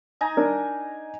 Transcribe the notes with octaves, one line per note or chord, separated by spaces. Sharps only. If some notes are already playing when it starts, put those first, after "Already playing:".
D#4 G#5 A#5
D4 A#4